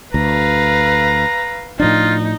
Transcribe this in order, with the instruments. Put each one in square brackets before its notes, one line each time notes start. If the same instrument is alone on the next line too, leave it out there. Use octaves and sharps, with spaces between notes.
[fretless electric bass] D2 [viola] B4 F5 [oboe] A#5
[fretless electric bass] A2 F3 D4 [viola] D#4 [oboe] F4